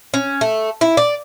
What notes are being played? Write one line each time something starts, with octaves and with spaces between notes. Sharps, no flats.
C#4
A3
E4
D5